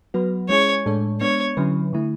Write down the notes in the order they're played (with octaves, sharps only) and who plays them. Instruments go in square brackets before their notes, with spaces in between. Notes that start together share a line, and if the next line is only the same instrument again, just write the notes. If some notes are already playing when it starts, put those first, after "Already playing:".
[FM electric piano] F#3 B3 F#4 B4
[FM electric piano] G#3 C#4 E4 G#4 [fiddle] C#5
[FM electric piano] A2 G#3 D4 A4 C#5
[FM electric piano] G#3 B3 D4 [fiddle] C#5
[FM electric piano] D3 F#3 C#4 E4 B4
D3 A3 E4